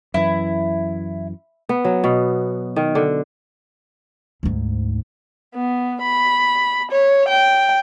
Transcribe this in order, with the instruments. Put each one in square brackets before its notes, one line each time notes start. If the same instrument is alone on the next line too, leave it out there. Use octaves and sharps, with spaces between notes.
[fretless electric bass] F#2 E3 [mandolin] E4
[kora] B3
F#3
B2
D#3
D3
[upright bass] D2 G#2
[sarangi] B3
B5
C#5
G5